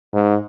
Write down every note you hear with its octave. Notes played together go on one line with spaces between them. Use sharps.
G#2